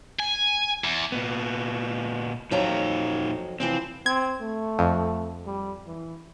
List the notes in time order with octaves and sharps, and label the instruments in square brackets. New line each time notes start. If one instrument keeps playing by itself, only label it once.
[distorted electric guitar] G#5
E2
[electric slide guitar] A#2 B3
[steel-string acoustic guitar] F2 F#3 A#5 [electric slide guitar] A#2 D#4 F5
[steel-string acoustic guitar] C3 E3 F3 [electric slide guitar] C4
[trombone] C4 [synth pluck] G#6
[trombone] A3
[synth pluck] F2
[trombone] G3
E3